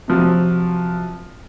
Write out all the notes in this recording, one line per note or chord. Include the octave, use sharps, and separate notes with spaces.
C3 F3 F#3